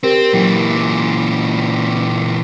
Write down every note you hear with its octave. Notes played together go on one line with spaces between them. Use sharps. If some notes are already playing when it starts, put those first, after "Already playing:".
C4 G4 A#4
A#2 E3 F#3